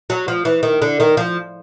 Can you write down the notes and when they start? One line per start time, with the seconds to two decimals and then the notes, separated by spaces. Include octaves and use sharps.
0.10 F#3
0.28 F3
0.45 E3
0.63 D#3
0.82 D3
1.00 D#3
1.17 F3